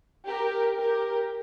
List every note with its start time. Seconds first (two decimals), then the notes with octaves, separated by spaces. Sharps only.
0.27 G4 A#4
0.77 G4 A#4